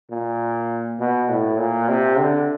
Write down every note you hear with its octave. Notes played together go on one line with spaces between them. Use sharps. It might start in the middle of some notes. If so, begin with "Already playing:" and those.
A#2
B2
A2
A#2
C3
D3